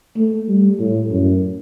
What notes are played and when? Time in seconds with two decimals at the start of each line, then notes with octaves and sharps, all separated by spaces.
0.17 A3
0.48 G3
0.79 A2
1.10 F#2